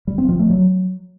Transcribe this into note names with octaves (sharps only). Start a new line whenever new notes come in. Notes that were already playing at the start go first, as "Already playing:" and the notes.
G3
C4
F3
A3
F#3